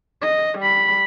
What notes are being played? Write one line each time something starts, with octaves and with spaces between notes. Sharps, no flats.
D#5
G3 B5